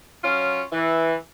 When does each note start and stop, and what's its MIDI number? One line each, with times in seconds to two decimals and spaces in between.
0.24 0.64 54
0.24 0.64 61
0.24 0.64 65
0.71 1.15 52